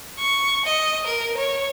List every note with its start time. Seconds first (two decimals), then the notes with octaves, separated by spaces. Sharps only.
0.19 C#6
0.65 D#5
1.07 A#4
1.37 C#5